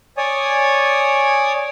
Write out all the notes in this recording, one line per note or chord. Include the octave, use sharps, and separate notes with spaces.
C#5 D5 G#5 D#6